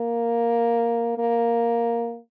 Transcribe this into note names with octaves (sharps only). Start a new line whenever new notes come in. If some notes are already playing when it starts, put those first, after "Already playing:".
Already playing: A#3
A#3